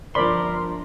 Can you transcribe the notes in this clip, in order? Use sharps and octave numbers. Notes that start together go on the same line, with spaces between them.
G1 F3 A#4 C5 D5 B5 C6